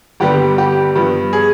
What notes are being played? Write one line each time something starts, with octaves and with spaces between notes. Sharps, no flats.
G2 D3 G3 B3 G4
G4
G2 F3 B3
G#4